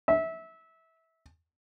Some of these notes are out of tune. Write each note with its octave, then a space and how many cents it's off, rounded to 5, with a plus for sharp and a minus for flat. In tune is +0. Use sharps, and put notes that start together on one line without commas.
E5 -20